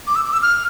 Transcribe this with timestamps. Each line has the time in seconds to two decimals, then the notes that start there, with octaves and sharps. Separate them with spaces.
0.07 D6
0.15 E6
0.25 D6
0.33 E6
0.42 F6